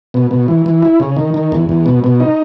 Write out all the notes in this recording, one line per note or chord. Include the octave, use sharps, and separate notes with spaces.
B2
B2
E3
E3
E4
C#3
D#3
D#3
E2
E2
B2
B2
D#4